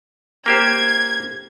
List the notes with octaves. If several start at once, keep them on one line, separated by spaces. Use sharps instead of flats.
A#3 G4 C5 G#6